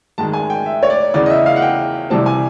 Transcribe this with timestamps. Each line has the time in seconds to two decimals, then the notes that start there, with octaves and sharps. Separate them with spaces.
0.18 G#2 D#3 G#3 A5
0.33 G#5
0.50 G5
0.66 E5
0.83 C#5
0.90 D5
1.14 E2 C#3 E3 D5
1.26 D#5
1.30 E5
1.46 F5
1.56 F#5
1.62 G5
2.10 C2 C3 E3 G3 C4 A5
2.26 G#5